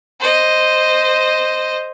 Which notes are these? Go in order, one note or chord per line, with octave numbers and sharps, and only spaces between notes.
C5 D#5